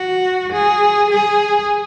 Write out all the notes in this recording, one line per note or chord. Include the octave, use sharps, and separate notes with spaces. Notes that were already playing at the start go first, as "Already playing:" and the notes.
Already playing: F#4
G#4
G#4